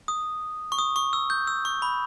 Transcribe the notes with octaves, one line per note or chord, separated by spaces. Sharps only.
D#6
C#6
D#6
C#6
E6
G6
E6
C#6
B5